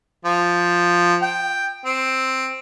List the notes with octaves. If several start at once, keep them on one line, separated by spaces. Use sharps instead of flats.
F3
G5
C4